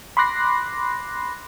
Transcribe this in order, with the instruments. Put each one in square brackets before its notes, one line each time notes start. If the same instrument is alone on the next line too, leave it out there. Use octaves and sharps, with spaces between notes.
[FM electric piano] B5 C6 D6 F#6 A#6 C7